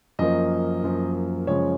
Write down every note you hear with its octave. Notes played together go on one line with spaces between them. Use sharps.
F#2 F3 A#3 D#5
F#2 F3 A#3
F#2 C#3 F3 G#3 C#5